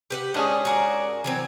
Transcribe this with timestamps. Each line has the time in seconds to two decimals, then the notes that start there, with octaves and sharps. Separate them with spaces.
0.10 G4 B4 F#5
0.34 G#2 C#4 D4 G#4 D#5 F#5 A5
0.65 F#4 A#4 D5 F#5 G#5 F#6
1.24 E3 F#3 C4